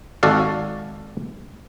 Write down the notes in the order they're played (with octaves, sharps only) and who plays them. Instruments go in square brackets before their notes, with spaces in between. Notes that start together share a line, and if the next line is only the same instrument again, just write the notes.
[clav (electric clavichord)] G#1 F#4 A4 D5 F5